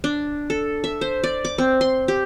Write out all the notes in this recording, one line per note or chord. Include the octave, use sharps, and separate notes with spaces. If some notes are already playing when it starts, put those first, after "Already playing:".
D4
A4
E5
C5
D5
D6
C4
C6
G4